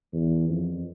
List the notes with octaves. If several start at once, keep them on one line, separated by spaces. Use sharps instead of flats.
E2
F2